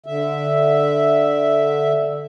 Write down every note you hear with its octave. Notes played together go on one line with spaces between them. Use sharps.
D3 E5